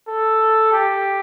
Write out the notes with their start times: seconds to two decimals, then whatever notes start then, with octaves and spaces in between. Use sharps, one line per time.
0.09 A4
0.73 G4